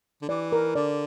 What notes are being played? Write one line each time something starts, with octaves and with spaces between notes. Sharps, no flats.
D3
E3 D5
A#4
D3 D5